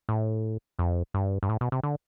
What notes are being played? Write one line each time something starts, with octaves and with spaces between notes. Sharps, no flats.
A2
F2
G2
G2
A2
B2
C3
D3